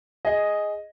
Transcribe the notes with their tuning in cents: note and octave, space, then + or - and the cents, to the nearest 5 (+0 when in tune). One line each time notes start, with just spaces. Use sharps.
G#4 +0 D#5 +0